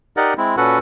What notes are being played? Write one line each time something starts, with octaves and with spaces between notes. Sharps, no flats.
D#4 G4 A#4 D5 D#5 F#5
G#3 C4 E4
A#2 C#4 F#4 A4 B4 F#5